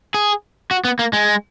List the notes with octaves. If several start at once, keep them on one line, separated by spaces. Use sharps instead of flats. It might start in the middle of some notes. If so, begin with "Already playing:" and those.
G#4
F#4
B3
A#3
G#3